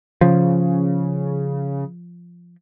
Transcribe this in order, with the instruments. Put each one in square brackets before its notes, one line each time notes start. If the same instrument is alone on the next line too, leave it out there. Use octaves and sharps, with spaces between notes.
[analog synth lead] C#3 [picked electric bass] F3